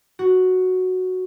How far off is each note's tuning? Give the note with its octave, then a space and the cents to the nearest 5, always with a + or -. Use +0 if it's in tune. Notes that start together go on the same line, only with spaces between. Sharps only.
F#4 +0